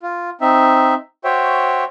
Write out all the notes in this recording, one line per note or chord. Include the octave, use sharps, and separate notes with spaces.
F4
C4 D#4 E5
F#4 C5 C#5 E5 G5